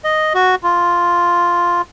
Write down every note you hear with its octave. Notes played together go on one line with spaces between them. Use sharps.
D#5
F#4
F4